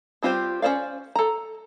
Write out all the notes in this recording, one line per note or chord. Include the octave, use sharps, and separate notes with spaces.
G3 C4 F4 G4 C5
C#4 A#4 C5 D5 F5
A4 A#5